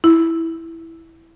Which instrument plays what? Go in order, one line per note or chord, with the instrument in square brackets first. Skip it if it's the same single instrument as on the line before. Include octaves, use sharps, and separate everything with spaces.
[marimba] E4